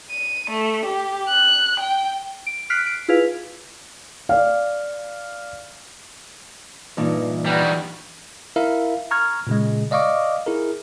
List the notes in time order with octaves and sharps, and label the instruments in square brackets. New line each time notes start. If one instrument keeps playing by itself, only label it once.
[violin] D#7
A3
G4
F#6
G5
[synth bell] D7
F6 F#6 B6 C7 D7
D7
E4 F4 G#4 B4 F5
[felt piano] D5 F5
[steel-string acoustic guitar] G2 A#2 [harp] E3 D4 D#4
[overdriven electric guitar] G3 F#4
[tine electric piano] E4 A#4 E5 F5
A#5 C#6 F6 G#6
A#2 C#3 G#3
D5 D#5 F5 C#6 D6
E4 G#4 A#4